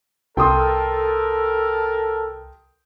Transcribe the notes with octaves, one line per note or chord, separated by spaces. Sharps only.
C2 A4 A#4 G5 C6 D#6